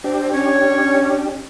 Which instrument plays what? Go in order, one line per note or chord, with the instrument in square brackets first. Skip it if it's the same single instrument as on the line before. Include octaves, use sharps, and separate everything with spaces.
[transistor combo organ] D4 G4 [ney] C5
[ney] C#4 [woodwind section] C#5